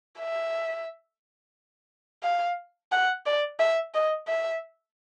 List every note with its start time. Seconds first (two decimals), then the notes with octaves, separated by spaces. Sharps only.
0.19 E5
2.23 F5
2.92 F#5
3.26 D5
3.60 E5
3.94 D#5
4.28 E5